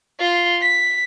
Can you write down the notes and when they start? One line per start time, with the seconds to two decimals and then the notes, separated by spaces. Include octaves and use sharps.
0.19 F4 C6
0.62 B6